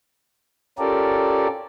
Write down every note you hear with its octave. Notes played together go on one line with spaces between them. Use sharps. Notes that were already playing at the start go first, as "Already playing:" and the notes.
C#4 F4 G4 A4 A#4 D5